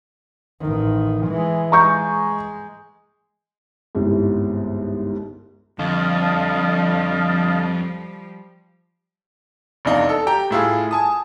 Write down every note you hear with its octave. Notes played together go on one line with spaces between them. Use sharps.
A1 D#3
E3 G#3
G#3 A#5 C#6 G6
G1 C2 G#2
F2 D3 F3 G3 D#5 F5 A5
F1 E2 D4 D#4 F5
A4
G4 G5 A#5
A2 E4 F4 G#4
G#5 A5 D#6